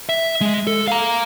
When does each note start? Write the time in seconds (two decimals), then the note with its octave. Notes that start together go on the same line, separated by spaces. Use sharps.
0.09 E5
0.41 G#3
0.67 A4
0.88 F5 A#5